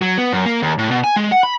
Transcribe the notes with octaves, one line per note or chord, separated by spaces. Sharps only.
F#3
B3
F#2
A#3
D#2
A2
B2
G#5
G#3
F#5
B5